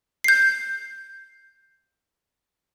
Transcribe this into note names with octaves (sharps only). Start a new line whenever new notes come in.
G6 C7